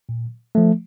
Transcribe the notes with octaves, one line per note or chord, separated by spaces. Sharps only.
A#2
F3 A3